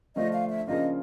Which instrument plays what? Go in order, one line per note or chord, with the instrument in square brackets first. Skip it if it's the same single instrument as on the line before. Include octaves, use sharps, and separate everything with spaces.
[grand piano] D3 F3 A3 D4 F4 [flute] D#5
[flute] F5
E5
[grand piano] C#3 F3 A#3 D4 F4 [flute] D#5